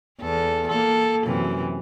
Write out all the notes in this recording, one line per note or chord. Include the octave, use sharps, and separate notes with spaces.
E2 A4
A#3 A4
F#2 C3 E3